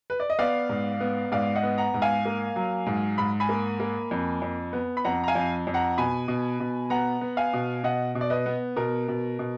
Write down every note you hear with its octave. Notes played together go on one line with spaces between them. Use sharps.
B4
D5
D#5
B3 D5 F5
G#2
B3
G#2 D5 F5
D#5 F#5
B3
F#5 A#5
G#2
F5 G#5
A#3
F#3
G#2
G#2 B5
G#5 B5
A#3
A#3
F2
F2
B3
B5
F2 F#5 A#5
A#5
F5 G#5
F2
F2
F#5 A#5
B2 G#5 B5
B2
B2
B3 F#5 A#5
B3
F5 G#5
B2
B2 D#5 F#5
B2
D5
B4 D#5
B3
B2 A#4
B2
B2